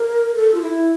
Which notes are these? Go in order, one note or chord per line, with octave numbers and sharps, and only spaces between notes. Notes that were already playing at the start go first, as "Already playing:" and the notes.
Already playing: A#4
A4
F4
E4